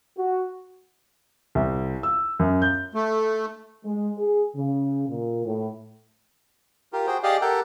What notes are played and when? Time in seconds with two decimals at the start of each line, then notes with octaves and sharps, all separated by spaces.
0.17 F#4
1.55 C2
2.03 E6
2.39 F#2
2.62 G6
2.94 A3
3.85 G#3
4.18 G#4
4.55 C#3
5.08 A#2
5.45 A2
6.93 F4 G4 A#4
7.07 F#4 G#4 C5 G5
7.23 G4 G#4 D5 D#5 F5
7.41 G4 A4 A#4 F#5 G5 A5